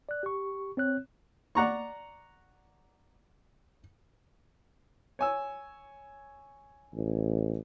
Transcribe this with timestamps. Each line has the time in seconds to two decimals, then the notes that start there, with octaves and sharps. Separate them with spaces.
0.09 D5 F#6
0.23 G4 C#6
0.77 C4 C#5 F#6
1.55 D5 F#5 A#5 C#6
5.19 C#5 G#5 E6
6.94 A1